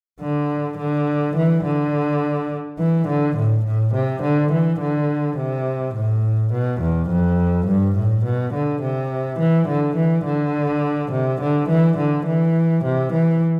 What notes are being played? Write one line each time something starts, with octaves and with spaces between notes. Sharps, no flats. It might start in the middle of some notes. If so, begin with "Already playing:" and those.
D3
D3
E3
D3
E3
D3
A2
A2
C3
D3
E3
D3
C3
A2
B2
E2
F2
G2
A2
B2
D3
C3
E3
D3
E3
D3
C3
D3
E3
D3
E3
C3
E3